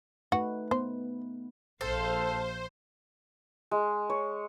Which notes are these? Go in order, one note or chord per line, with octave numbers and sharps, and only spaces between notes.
A3 D#4 F#4 B4
B3 C5
A#1 A4 C5 F5
G#3
C#5